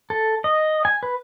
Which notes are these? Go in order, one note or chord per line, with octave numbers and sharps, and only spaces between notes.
A4
D#5
G#5
B4